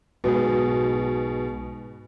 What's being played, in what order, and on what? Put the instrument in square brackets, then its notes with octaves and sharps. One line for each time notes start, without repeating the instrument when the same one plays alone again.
[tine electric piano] B1 G#2 G#4 [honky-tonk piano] B2